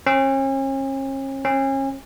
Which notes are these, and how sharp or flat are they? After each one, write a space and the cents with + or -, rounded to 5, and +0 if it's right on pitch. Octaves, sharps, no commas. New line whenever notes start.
C#4 -40
C#4 -35